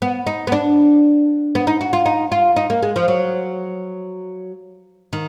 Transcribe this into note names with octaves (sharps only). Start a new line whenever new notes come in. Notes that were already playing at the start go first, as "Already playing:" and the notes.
B3
D#4
B3
D4
B3
D#4
F#4
F4
D#4
F4
D#4
A#3
G#3
F3
F#3
D#3